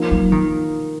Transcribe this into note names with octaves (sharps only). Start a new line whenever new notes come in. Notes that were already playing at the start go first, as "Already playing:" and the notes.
Already playing: F3 A#3 D#4
F#3
D#3